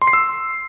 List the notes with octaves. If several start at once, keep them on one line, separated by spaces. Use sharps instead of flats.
C6
C7
E6